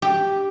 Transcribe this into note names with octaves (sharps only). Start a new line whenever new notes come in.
G4